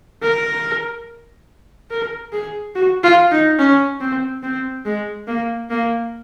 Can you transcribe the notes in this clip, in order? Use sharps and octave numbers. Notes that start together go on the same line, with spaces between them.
A#4
A#4
G#4
F#4
F4
D#4
C#4
C4
C4
G#3
A#3
A#3